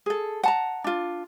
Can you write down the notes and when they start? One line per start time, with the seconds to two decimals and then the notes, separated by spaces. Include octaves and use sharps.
0.06 G#4 A4
0.43 F#5 A5 A#5
0.84 D4 F4